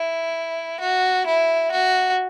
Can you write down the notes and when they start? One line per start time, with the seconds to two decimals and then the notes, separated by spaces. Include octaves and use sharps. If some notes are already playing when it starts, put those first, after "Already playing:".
Already playing: E4
0.80 F#4
1.26 E4
1.72 F#4